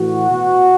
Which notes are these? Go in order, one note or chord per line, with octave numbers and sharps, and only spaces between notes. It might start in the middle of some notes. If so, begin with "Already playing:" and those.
Already playing: A2 E3 F#4
B2